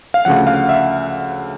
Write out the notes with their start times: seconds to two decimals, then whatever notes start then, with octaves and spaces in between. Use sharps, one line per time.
0.14 F5
0.25 D2 C#3 F3 F#5
0.47 F5
0.69 E5